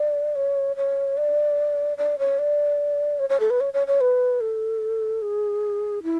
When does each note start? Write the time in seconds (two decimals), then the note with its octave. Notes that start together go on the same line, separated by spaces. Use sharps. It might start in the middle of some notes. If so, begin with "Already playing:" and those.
Already playing: D5
0.35 C#5
0.76 C#5
1.17 D5
1.98 D5
2.19 C#5
2.39 D5
3.19 C#5
3.29 C#5
3.40 A4
3.50 B4
3.60 C#5
3.74 C#5
3.87 C#5
4.01 B4
4.41 A4
5.22 G#4
6.03 E4